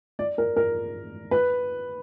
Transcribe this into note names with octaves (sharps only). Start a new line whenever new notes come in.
D5
A#4
A#4
B4